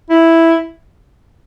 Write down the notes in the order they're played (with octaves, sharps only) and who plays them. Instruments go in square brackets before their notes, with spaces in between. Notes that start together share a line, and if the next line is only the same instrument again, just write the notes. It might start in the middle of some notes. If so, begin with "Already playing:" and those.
[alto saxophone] E4